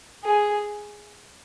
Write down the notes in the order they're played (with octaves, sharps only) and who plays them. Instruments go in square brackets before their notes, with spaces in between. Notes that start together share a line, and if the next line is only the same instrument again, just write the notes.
[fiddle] G#4